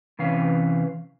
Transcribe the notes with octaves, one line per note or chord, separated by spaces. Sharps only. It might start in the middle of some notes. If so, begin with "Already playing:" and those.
C3 E3 C#4 B4 F5